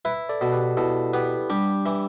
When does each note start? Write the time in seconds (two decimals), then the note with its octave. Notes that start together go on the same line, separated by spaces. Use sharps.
0.05 E4 B4 E5
0.29 A4 D5
0.41 B2 A4
0.53 G4 B4
0.77 B2 E4 A4
1.13 B3 G4 B4
1.50 G3 D4 G4
1.86 E3